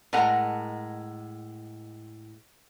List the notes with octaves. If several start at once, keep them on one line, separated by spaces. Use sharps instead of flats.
A2 G#3 A#4 F#5 A#5